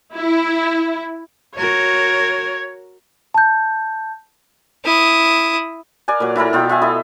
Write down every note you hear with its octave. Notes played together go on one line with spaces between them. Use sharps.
E4
F#4 A#4 C#5
A5 G6
E4 D#6
A#4 D5 F#5 G#5
A#2 F#3
E3 E4 A4 A#4
B2 F4 G5
F4 E5 G#5
E4 A4 D#5